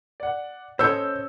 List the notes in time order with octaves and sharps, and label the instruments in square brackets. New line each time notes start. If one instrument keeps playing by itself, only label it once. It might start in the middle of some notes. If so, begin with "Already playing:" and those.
[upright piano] D5 F#5
[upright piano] C#4 A4 D#5 [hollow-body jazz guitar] C5 C#5 [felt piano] E6 G6